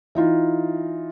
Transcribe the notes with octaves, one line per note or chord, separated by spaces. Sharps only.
E3 D#4 F4